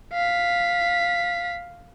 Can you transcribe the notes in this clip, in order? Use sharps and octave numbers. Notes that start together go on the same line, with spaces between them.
F5 B6